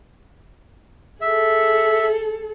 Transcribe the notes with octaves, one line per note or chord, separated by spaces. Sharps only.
G#4 A4 E5